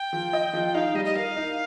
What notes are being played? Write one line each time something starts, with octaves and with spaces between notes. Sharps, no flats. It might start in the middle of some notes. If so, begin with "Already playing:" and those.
Already playing: G5
F3
D#5
F3
D#4 F5
G3 D#5
D#5
A#4 F5
D#4